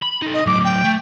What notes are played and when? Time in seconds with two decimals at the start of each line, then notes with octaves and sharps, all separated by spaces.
0.02 B5
0.22 D#4 A4
0.34 D#5
0.47 A2 F#3 D6
0.65 G5
0.84 A3